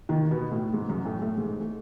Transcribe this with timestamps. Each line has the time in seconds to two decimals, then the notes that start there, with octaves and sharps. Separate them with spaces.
0.09 D#2 D#3
0.31 B2 B3
0.52 A2 A3
0.73 G#2 G#3
0.89 F#2 F#3
1.05 A2 A3
1.22 A2 A3
1.37 G#2 G#3
1.61 A3